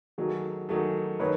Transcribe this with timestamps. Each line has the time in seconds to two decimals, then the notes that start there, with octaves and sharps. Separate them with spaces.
0.18 D#3 F#3 A3 F#4 G#4
0.69 D#3 F#3 A3 F#4 G#4
1.20 D#3 F#3 A3 B4 C#5